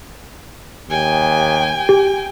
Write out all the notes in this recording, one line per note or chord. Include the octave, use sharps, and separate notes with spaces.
D#2 G5 G#5
G4